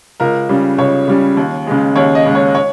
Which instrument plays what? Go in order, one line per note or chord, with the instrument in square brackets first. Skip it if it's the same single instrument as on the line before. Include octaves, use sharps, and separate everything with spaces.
[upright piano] C#2 A#4
C#3 G3
C#2 C#5
C#3 G3
D#2
C#3 G#3
D#2 C#5
D#5
C#3 G#3
C#5
C#5